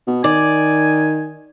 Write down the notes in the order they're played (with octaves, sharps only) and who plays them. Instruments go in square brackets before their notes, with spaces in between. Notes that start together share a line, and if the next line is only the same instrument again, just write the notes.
[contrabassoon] B2
[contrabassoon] D#3 [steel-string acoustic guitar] D5 [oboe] G#5